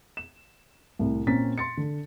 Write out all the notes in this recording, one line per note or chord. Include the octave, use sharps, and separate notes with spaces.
E7
C2 A2
A#2 C4 C#4 A#5 A6 B6
C6 A6 C#7
D3